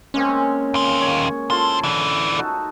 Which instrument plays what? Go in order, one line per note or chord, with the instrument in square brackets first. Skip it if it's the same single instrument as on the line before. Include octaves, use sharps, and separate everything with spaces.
[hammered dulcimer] G#3 A#3 C4 [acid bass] C#4
[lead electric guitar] D#2 F4
[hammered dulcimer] C#5
[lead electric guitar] D2 C5 [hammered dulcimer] E4 F4 A4
[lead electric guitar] D3 E3
[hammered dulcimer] D#4 F#4 A4